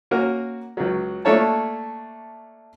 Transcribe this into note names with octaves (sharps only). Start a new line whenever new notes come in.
A#3 C#4 F#4 A#4
C#2 F#3
A3 A#3 D4 A4 C#5 A5